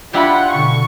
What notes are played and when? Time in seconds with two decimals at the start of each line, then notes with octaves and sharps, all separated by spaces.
0.13 D4 E4 F4 G4 F#5 G5 B5
0.52 B2 D3 C#6